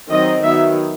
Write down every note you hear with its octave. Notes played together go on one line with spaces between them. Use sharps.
D#3 F#3 C4 D#5
D#3 F#3 B3 E5